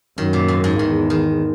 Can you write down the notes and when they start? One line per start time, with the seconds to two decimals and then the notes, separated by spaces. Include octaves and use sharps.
0.18 F#2 D#3
0.33 A#2
0.48 G#2
0.64 G#2
0.79 E2 D#3
1.10 D#3